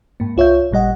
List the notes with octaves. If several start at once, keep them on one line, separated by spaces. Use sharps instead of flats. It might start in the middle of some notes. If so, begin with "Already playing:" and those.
G#2 A#3
C2 F4 C#5 E5 G6
G#1 A#2 G3 D#5 F#5